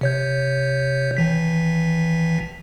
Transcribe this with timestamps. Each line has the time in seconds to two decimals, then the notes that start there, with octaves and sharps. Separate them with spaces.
0.01 C3 C#5 G6
1.17 G#1 E3 B6